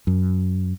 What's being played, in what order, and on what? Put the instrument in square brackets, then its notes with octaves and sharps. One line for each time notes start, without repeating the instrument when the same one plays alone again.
[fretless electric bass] F#2